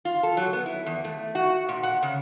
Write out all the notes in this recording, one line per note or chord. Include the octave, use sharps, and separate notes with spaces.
F4
A4
F#3
B3
E4
E2
A3
F#4
A#2
F#5
C#3